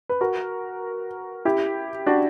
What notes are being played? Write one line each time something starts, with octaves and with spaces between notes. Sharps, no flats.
B4
F#4 A#4
E4 G4
D4 F#4